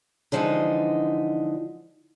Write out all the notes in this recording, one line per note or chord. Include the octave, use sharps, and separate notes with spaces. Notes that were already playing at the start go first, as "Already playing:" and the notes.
D3 E3 F3 G#3 C4 D#4